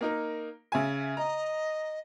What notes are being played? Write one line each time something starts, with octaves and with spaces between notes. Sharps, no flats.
A#3 D#4 A#4
C#3 E5 G#5
D#5 A#5